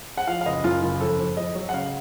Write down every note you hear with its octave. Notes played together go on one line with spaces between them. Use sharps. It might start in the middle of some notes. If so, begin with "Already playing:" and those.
F#5
F3 F5
F5
F#1 D#5
F#2 F4
F#1 F4
F2 A4
F2
F2 D#5
F#3
F#5
C#3 F5